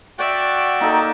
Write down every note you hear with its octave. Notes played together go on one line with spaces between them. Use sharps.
F#4 D5 E5 F#5 G5
A#3 D#4 A4